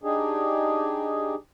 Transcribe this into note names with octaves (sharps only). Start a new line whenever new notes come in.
D4 D#4 G4 G#4